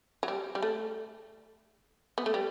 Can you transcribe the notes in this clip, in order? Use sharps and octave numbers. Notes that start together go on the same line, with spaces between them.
F#3
G3
G3
A3
B3
A3
G3